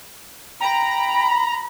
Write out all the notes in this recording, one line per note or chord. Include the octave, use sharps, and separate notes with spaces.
G5 A#5 B5